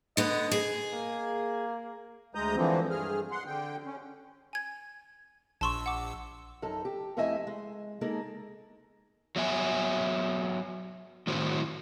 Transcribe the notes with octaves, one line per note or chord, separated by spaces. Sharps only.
D3 B3 D#5
G#4
A#3
D2 G#3 A#5 D#6 G6
D3 E3 F3 C4
G2 G#4 F6
F#5 C6
D3 G5
C#4
G#5 G#6
A#1 A5 C6 C#6 E6
F#5 D6
F#2 D#4 A4
G4
F2 A3 E4 D#5 E5 G#5
G#3
G#3 A#3 D#4 G#4 A4
F#3 B3 E5 G#5
A2 D#3 C4 E4 F#4